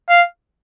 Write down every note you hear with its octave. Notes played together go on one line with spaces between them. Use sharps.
F5